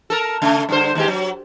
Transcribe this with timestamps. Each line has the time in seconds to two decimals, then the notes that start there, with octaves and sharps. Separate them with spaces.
0.10 A4 A#4
0.42 C#3 A3
0.69 G2 D3 C5
0.95 D#2 G#3 G4
1.08 F#3